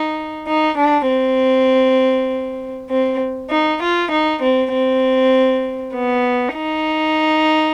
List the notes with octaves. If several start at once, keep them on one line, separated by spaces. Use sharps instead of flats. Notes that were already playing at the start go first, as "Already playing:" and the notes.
Already playing: D#4
D#4
D4
C4
C4
D#4
F4
D#4
C4
C4
B3
D#4